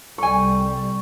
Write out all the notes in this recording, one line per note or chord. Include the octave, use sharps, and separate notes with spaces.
C2 G3 A4 G#5 C#6